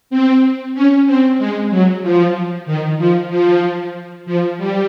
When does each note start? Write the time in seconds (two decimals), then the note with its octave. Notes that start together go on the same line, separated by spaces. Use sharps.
0.10 C4
0.75 C#4
1.06 C4
1.38 G#3
1.70 F#3
2.03 F3
2.66 D#3
2.98 F3
3.30 F3
4.26 F3
4.58 G3